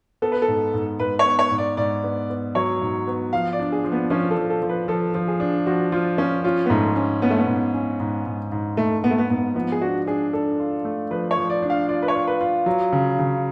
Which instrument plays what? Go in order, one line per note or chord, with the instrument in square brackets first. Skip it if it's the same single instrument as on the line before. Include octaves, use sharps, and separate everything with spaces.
[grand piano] B3 [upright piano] A4
[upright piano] B4
A4
[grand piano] G#2
G#2
[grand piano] G#2 [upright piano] B4
[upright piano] C#5
[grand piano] B3
[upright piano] C#5
[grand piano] G#2
[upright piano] D5
[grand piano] G#2 [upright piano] D5
[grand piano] B3
B3
[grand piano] F#3 [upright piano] C#5
[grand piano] G#2
B3
[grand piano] F3 [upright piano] F5
[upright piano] D5
[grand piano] D4
[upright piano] G#4
[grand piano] F3
[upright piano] B3
[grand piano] F3 [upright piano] C#4
[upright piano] A4
[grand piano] F3
[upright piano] A4
[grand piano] F3
[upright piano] B4
[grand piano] F3 [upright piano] A4
[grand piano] F3
[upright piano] G#4
[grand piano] D4
[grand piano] F3 [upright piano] F#4
[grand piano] F3 [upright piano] F4
[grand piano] F3 [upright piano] C#4
[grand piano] C#4 [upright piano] F4
[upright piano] B3
[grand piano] G#2 [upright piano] A3
[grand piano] C#4
[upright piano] B3 [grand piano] C#4
[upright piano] A3
B3
[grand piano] G#2
C#4
G#2
G#2
G#2
[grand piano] G#2 [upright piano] A3
[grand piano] G#2 [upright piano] B3
[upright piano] A3
B3
[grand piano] G#2 [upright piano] B3
[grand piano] F3 [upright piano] B3
[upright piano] G#4
[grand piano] D4 [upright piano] F#4
[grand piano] D4 [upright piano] G#4
[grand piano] D4 [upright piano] A4
[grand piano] F4
A3
[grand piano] F3 [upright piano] B4
[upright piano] C#5
[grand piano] F3
[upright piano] D5
[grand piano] D4
[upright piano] F5
[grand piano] F4 [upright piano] D5
[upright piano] B4
C#5
[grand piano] F4
[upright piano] B4
[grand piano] F4
F#3
C#3
C#3